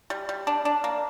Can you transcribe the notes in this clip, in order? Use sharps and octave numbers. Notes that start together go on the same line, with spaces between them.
G3
G3
D4
D4
A#3